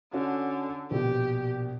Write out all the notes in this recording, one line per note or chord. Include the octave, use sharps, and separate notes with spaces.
D3 C#4 F#4
A#1 B2 G4